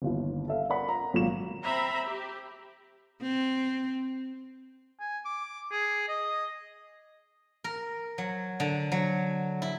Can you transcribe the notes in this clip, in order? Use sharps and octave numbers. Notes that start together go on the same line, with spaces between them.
G1 D#2 E4
A4 E5 F5
A#4 D5 F#5 B5
A#5
G#1 A#2 F#3 A#3 F#4 E7
C4 E5 A#5 B5
G4
C4
G#5
D6
G#4
D#5
A#4
F#3
D3
F#3
E4